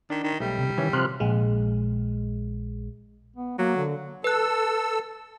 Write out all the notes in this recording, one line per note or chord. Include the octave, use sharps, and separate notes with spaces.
D#3 D4
D#3
B1 G3 A3
C3
D#3 E3 C#4
C3 F3 C6 F6 F#6
A#1 G#3
B3
F#3 A#3
D3
A4 B4 E6 F#6